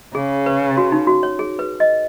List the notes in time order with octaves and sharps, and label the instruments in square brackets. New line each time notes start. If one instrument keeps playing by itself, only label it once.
[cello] C#3 [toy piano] G#4
[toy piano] B4
F#4
D#4
F#4
C#5
G#4
B4
D#5